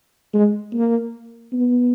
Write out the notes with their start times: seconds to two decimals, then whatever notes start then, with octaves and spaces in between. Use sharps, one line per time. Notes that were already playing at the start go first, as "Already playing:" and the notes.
0.34 G#3
0.73 A#3
1.52 B3